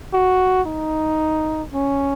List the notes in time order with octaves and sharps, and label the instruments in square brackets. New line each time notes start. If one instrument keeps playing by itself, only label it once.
[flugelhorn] F#4
D#4
C#4